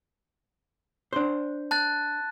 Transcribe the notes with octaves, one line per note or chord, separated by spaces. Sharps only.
D4 C5
A5 F#6 A6